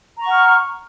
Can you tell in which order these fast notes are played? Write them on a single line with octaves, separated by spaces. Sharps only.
A#5 C#6 F#5 F6